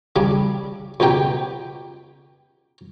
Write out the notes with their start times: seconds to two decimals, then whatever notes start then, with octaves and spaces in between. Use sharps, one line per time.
0.16 C#3 G3 D4
1.00 C#2 B2 D#4 G4 G5